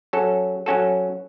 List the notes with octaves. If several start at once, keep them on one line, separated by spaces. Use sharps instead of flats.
F#3 C#4 F#4 A4
F#3 C#4 F#4 A4